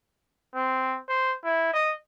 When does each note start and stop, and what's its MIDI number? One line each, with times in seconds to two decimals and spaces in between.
0.55 0.98 60
1.09 1.33 72
1.44 1.71 64
1.74 1.95 75